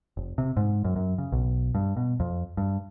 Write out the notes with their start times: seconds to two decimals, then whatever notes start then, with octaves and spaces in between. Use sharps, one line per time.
0.17 F1
0.38 C3
0.57 G#2
0.84 F#2
0.96 F#2
1.18 C#3
1.32 B1
1.75 G2
1.97 B2
2.20 F2
2.57 G2